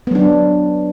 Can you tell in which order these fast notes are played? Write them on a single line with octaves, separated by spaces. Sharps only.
B3 F#3 D4